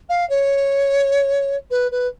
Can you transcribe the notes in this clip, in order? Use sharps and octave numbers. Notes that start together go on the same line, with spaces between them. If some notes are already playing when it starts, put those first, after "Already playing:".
F5
C#5
B4
B4